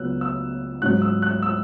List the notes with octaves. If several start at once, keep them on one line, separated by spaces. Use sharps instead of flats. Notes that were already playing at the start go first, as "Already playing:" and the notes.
Already playing: C#2 C#3 F#3 B3 E6 F#6
E6
G#2 F#3 C#4 F#6
E6
F#6
E6